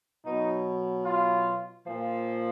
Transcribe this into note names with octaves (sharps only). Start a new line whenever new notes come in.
B2 F#3 D#4
F4
A#2 F3